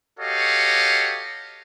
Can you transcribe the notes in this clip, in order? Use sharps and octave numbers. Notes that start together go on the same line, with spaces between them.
F#4 G4 A4 C#5 D#5 F5